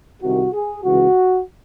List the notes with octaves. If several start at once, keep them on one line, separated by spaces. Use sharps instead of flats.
C2 C3 D#3 F#4
G#4
C#2 C#3 E3 F#4